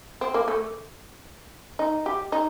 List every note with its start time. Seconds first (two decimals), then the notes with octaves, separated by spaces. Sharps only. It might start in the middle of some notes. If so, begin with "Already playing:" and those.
0.21 C4
0.34 A#3
0.48 A3
1.79 D#4
2.06 G4
2.32 D#4